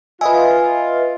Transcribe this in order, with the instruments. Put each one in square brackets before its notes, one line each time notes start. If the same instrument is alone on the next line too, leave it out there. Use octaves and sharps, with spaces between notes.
[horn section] F4 [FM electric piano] B4 D#5 E5 [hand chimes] G#5